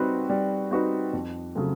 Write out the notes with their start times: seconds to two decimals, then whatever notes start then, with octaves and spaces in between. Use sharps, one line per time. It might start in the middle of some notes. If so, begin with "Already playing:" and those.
Already playing: G3 C4 D#4 F#4 B4
0.30 G3
0.71 C4 D#4 F#4 B4
1.13 F2
1.55 C#3 F#3 A3 C4